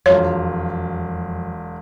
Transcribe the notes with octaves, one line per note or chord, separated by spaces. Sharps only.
E1 F2 F#3 F4 C#5